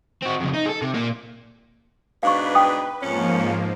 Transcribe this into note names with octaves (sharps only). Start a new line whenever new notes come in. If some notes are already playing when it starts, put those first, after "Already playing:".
C4 F#4
F2 C#3
D#4
G#4 A4
C3
A#2 A#3
G#2 B2 D4 B4 F5 C#6
G5 D#6
F2 G#2 F3 A#3 C#4